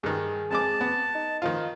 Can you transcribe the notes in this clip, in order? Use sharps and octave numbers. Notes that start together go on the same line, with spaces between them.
G2 D#3 G#4
F2 G#3 A5 D6
B3
D#4
D#3 F3 D#4 F4